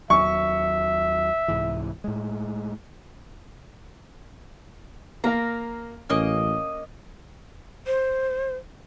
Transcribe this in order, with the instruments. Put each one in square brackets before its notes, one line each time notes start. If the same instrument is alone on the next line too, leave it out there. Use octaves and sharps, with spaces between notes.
[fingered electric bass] D#2 F#3 [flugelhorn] E5 [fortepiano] C#6
[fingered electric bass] C2 G#2 E3
A2 G#3
[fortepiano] A#3 A#4 F5 [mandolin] A#5
[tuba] A1 [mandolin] A#3 D#5 [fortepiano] C#4
[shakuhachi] C5